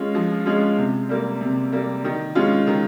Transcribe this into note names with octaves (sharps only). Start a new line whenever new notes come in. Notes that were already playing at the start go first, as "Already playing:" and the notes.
Already playing: G#3 C#4 F4
F3
G#3 C#4 F4
C3
G3 A#3
C3
G3 A#3
D#3
G#3 C#4 F4
D#3